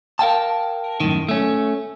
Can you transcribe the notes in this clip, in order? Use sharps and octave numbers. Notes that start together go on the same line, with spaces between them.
A#4 F5 G5 A5
F#2 A2 D#3
A3 C#4